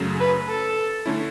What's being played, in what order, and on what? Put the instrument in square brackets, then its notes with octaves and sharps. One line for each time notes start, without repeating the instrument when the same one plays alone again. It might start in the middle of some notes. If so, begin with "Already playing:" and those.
Already playing: [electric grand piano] F#2 C#3 F#3 A3
[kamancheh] B4
A4
[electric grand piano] D3 A3 C#4 E4